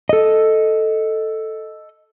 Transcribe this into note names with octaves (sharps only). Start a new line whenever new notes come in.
A4 D#5